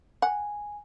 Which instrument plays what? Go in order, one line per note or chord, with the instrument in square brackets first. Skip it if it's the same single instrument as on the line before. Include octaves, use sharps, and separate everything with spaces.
[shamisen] F#5 [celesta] G#5